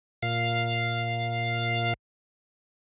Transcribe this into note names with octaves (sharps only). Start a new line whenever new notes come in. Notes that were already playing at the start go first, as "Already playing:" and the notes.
A#2 F5